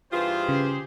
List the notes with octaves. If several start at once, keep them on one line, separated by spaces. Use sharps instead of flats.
G2 E3 F4 G4 G#4 C5
C#3